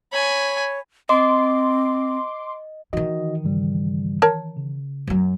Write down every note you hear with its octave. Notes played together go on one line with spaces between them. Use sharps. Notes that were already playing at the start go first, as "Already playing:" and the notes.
C#5 G#5 B5
C4 D#5 C6 D6
D#3 E3 D#4 F#4 D#5
G2 C#3 G3
A#4 C#5 A5
C#3
F#2 F#3